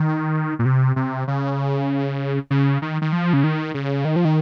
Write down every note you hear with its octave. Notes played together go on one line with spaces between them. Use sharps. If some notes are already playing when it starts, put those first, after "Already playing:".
Already playing: D#3
A#2
C3
C3
C#3
C#3
D#3
D#3
F3
C#3
D#3
C#3
D#3
F3
D#3